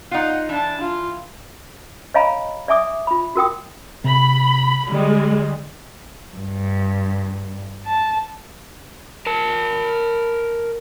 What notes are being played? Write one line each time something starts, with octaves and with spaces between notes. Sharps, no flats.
D#4 F4 F#5
E3 D4 A5
F4
C#5 D#5 F5 G#5 A#5 B5
D5 E5 G#5 D6 D#6
F4 B5
F#4 A#4 G5 D#6
C3 B5
D3 G3 G#3
G2
A5
A#4 A5